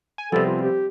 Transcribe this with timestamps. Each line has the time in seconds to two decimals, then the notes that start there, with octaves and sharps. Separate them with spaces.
0.18 G#5
0.32 C3 F3 G3 B3 C4 A4
0.46 F4
0.62 G4